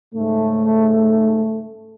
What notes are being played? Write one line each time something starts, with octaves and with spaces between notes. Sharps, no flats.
G#2 C#3 A3